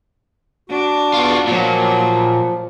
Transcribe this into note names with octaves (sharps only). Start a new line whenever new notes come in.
D4 F#4
E2 B3 F4 F#4
A#2 F3 F#3 A#3